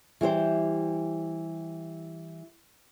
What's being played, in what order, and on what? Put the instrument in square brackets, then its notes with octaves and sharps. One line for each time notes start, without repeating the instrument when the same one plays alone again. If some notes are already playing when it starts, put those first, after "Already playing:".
[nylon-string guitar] E3 G3 G4 C5